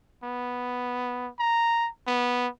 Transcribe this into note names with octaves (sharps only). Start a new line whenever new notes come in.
B3
A#5
B3